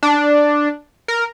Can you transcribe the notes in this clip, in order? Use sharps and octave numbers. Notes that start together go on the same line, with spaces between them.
D4
A#4